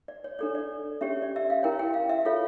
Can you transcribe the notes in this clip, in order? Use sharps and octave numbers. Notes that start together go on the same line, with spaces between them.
D5
C#5
D4 A4 C#5 D5
D5
C#4 G4 C#5 E5
D5
E5
F5
E4 A#4 C#5 G5
G5
F5
E5
F4 A4 C#5 F5